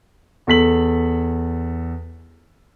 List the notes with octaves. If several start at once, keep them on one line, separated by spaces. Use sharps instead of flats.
E2 A4 B6 F#7